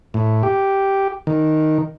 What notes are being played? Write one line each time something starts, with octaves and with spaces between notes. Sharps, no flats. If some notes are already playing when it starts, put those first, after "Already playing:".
A2
G4
D#3